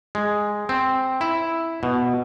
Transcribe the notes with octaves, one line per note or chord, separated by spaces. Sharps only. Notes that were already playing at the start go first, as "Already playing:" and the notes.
G#3
C4
E4
B2